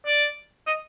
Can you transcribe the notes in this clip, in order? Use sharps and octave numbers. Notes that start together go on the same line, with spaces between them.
D5
D#5